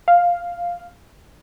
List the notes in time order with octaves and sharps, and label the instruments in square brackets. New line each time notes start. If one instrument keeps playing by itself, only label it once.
[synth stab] F5